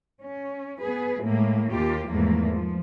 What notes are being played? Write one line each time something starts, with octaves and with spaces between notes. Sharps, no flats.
C#4
B3 G#4 B4
A2 G#3 A#3
D#2 A#3 F4 G4
E2 G#2 F3 A3 A#3
F3